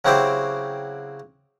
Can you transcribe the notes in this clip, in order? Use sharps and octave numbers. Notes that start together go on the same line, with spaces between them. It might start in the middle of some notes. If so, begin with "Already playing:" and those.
C#3 F#3 C4 E4 G4 C5